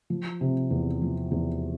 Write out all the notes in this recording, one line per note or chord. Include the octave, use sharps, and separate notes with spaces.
F3
C3
E2
F3
E2